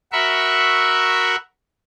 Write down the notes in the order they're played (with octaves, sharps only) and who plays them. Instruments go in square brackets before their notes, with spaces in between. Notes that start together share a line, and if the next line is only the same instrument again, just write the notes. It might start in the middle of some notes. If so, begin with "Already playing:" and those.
[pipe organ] F#4 A#4 E5 B5 C#6